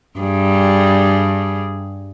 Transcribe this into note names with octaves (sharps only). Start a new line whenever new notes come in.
G2 G3 G#4